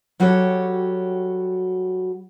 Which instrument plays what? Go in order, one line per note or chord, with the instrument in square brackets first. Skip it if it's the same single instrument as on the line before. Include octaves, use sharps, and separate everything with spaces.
[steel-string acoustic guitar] F#3 G3 F#4 G4 A4 C#5